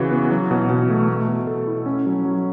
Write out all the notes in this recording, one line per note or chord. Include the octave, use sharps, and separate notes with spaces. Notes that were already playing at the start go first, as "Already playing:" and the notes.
Already playing: C#3 E3 F#4
B3
F#3
B2
B2
A3
A3
B2
A4
E4
C#4
F#3
F#3